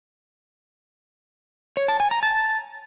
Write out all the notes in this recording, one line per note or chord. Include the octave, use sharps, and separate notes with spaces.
C#5
A5
G#5
A#5
A5